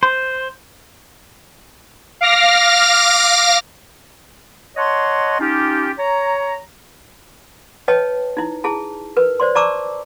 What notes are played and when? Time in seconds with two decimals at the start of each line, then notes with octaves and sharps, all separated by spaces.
0.03 C5
2.21 F5 D6 F6 A#6
4.76 C#5 D#5 F#5 A5 C6
5.40 C#4 D#4 F4 G4
5.99 C#5 A#5
7.88 B4 C#5 D#5 G5 A5
8.37 D#4 E4
8.64 E4 G#4 A5
9.17 A#4 B4
9.40 C5 D5 C6
9.55 D5 A5 A#5 C#6 D6 E6